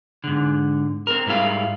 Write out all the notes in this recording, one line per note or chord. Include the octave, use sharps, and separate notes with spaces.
G#2 D3
C4 A#4
G#2 G3 E4 F5